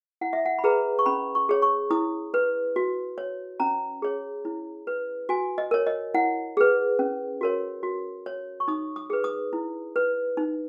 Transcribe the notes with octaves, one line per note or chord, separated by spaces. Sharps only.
E4 F#5
E5
F#5
B5
G#4 B4 A#5
C#6
C#4 B5
C#6
G#4 C#5
C#6
E4 D#6
B4
F#4
C#5
C#4 A#5
G#4 C#5
E4
B4
F#4 G#5
D#5
A#4 C#5
D#5
E4 F#5
G#4 B4
C#4
F#4 A#4 C#5
F#4
C#5
C#6
D#4 D#6
D#6
G#4 B4
D#6
E4
B4
D#4